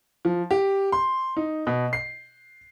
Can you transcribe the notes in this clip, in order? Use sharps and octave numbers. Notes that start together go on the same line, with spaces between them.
F3
G4
C6
D#4
B2
C7